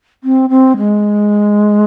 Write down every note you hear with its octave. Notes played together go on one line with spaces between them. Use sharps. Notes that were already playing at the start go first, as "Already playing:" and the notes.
C4
C4
G#3